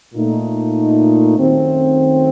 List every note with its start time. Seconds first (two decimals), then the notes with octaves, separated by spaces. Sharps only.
0.14 A#2 A3 D#4
1.37 F#2 D#3 F#3 A3 C4